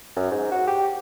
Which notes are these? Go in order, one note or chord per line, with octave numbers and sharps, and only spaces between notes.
F#2
G#2
F#4
G4